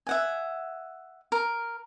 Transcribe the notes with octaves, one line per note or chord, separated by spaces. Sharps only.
E5 F#5 G#5
A#4